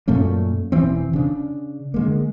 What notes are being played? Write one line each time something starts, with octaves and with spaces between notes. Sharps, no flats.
F#2 A#2 A3 C#4
E1 E3 C4
C#3 D4
D3 G#3 A#3